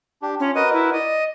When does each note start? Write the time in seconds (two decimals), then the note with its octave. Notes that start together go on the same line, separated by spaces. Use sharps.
0.22 D4 G4
0.40 C#4 F4
0.55 F#4 A#4 B4 D#5
0.73 E4
0.93 D5 D#5